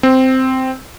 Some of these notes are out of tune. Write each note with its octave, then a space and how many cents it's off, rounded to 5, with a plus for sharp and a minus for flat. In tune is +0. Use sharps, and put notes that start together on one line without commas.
C4 -5